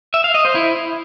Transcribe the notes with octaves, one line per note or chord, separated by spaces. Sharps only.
E5
F5
D#5
C5
E4